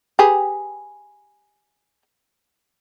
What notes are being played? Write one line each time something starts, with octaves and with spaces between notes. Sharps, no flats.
G4 G#4 B4